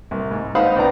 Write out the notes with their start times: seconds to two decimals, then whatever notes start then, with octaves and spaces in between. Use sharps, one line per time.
0.11 C2
0.31 G#2
0.55 D#4 C5 F5 F#5 B5 D#6
0.76 C#2 B3 D5 A#5